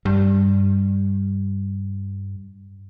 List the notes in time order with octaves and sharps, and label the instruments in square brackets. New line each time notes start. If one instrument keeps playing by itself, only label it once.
[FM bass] G2 [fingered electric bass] G3